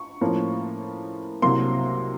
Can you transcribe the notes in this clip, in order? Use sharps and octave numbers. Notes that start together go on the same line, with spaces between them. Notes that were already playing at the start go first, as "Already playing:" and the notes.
Already playing: C#6
A2 F3 A#3 C#4
C2 C3 F#3 A#3 C6